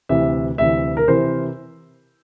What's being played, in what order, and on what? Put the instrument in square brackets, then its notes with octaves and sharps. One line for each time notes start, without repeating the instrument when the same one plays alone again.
[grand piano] D2 C3 E3 E5
D2 C3 E3 E5
A#4
C3 E3 C5